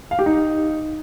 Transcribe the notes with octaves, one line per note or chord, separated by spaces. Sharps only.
F5
G4
D#4